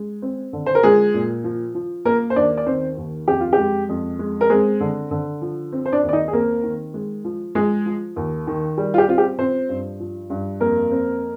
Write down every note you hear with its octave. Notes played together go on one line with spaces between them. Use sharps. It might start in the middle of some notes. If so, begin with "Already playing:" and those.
Already playing: G#3
C4
D3
C5
A#4
F3 G#3 G#4
A#2
F3
F3
A#3 A#4
C5
D#2 D4 D5
D5
D#3 C4 C5
D#2
F2 G4
F4
G4
G#3
F2
G#3
A#4
G#3 C4 G#4
D3
D3
F3
C4
C5
D4 D5
D#2
D5
D#4 D#5
G#4
A#3 C4 A#4
D#3
G#3
F3
F3 G#3 G#4
F3
D#2
D#3
G3
F4
G4
C4 F4
G4
F3 C4 C5
G2
F3
G2
F2 A#3 A#4
C4